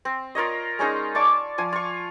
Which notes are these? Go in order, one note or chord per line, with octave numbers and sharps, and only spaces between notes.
C4
F4 A#4 C#5 D#5
G#3 C#4 D#4 G#4
D5 A5 C#6 D6
F3 G#5
F4 C#6